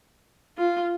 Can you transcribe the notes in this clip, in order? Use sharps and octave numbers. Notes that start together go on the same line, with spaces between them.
F4